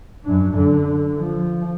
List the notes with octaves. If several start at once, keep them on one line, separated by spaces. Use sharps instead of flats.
F#2 D4
D3
F3